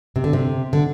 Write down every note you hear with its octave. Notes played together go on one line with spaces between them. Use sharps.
C3
D3
C3
D3